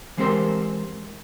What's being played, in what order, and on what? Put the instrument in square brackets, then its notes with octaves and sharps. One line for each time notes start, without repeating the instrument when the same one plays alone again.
[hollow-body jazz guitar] E3 G#3 C4 G4 A#4 C5